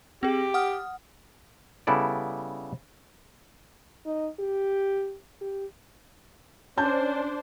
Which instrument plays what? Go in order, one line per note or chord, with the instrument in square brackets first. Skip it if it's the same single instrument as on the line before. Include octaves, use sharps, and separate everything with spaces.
[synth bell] C4 G#4 [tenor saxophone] G4
[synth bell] F#5 D#6 F6
[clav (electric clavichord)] C#3 G3 B3 E4 A4 D5
[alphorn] D#4
G4
G4
[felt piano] C#4 A5 G6 [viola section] D4 C5